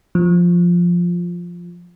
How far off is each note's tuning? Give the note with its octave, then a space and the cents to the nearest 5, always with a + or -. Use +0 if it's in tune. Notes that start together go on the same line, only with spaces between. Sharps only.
F3 +0